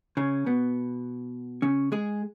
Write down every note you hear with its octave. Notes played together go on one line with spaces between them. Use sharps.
C#3 C#4
B2 B3
C#3 C#4
G#3 G#4